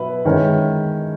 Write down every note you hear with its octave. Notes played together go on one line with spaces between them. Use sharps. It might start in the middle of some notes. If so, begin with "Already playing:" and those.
Already playing: B2 F#3 B3 E4 B4
D#3 G#3 C#4 E4